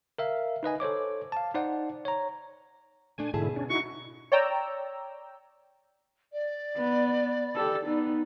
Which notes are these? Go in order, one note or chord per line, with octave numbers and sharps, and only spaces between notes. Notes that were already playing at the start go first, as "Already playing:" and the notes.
A#4 E5 F5
D#4 B4 D#5 G#5
A4 C5 C#5 D6
F5 A5
D#4 C5 D5 F#5
C#5 A#5
A#2 A3 D4 G#5
G#2 B2 D3 E4 G#4 A5
C#4 D4
D#4 E4 F#4 C#6
C#5 D5 G5 A#5 E6
D5
B3
G4 A4
B3 D#4